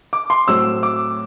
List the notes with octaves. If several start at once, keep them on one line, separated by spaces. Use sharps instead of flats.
D6
C6
A2 F#3 C4 E6
D6